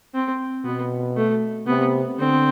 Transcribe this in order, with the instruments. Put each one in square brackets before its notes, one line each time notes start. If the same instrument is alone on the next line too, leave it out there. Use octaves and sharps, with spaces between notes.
[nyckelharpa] C4
[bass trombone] B2 [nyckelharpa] B3
[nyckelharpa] A3
[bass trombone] C3 [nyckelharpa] B3
[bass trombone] D3 [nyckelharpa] C4